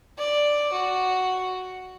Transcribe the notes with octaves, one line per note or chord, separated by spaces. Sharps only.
D5
F#4